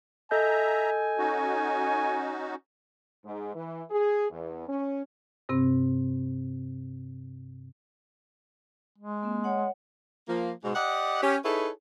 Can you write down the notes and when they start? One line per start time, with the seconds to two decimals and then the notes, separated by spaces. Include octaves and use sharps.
0.31 A4 D#5 E5 G#5 A#5 G6
1.18 C#4 D#4 F#4
3.25 G#2
3.54 E3
3.90 G#4
4.30 E2
4.69 C#4
5.49 G2 C3 C4
8.98 G#3
9.23 A#3 C4
9.44 C#5 D#5 F#5
10.28 F3 A#3
10.63 G#2 B2
10.75 G4 D5 D#5 F#5
11.21 C#4 G4
11.44 D#4 E4 G#4 A4 B4 C#5